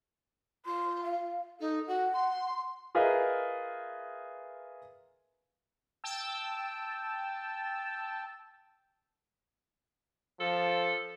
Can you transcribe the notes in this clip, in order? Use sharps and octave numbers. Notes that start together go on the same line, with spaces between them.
F4 C6
F5
D#4 A4
F#4 F#5
C6
F4 G#4 A#4 B4 D#5 E5
G5 A5 E6
F3 A4